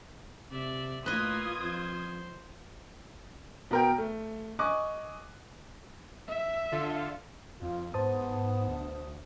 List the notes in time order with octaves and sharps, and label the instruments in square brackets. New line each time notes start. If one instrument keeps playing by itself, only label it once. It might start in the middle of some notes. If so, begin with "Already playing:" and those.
[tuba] C3 [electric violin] D5 E5
[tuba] A2 [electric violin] A#3 C6 [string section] F4 D#6 G#6 [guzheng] B4 D#5
[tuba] F2 [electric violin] C5
[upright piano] B2 A#4 G5
A3
D#5 G#5 C#6 D6 F#6
[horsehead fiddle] E5
[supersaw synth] D3 F4 A4
[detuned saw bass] F2 [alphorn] F4
[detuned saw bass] G#2 [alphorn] B3 [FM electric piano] C5 A5 D#6
[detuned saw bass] D2